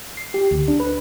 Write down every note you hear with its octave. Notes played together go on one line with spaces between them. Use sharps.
C7
G4
D2
D4
B4